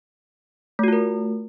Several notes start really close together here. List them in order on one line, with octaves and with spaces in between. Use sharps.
A3 F#4 F4 A#4